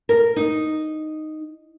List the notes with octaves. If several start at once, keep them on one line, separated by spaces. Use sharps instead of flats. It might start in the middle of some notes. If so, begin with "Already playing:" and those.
A#4
D#4